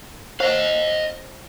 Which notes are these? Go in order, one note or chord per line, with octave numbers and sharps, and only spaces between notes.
C5 D#5 F5 F#5